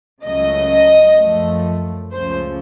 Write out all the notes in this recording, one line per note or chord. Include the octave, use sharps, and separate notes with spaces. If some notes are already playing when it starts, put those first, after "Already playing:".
C#2 C#3 F#3 A3 D#5
F#2 F3 A3
C#2 C#3 F3 A3 C5